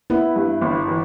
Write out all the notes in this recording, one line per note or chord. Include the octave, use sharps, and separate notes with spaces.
B3 E4
G2
G1
E3